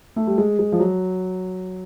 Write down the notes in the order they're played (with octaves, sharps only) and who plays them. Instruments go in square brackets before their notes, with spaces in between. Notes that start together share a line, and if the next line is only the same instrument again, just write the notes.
[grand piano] A3
G3
G#3
G#3
F3
F#3